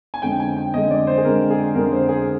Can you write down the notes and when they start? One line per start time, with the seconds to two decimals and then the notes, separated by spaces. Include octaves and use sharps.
0.14 G#5
0.22 F2 D3 G#3 G5
0.40 G#5
0.56 G5
0.74 F2 D3 G#3 D#5
0.91 D5
1.07 C5
1.18 G#4
1.25 F2 D3 G#3 A#4
1.50 G#4
1.75 F2 D3 G#3 A#4
1.92 C5
2.09 G#4